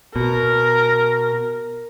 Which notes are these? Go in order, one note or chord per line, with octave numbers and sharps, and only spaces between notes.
B2 A#4